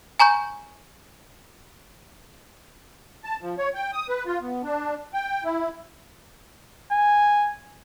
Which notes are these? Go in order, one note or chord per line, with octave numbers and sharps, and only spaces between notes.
G#5 A#5 C#6 G6
A5
F3
C#5
G5
D#6
B4
F4
B3
D4
G5
E4
G#5